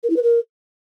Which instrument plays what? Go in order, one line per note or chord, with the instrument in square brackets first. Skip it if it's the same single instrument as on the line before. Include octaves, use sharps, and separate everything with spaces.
[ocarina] A#4
E4
B4
A#4